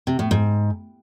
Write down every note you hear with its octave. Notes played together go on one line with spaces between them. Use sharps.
C3
A2
G#2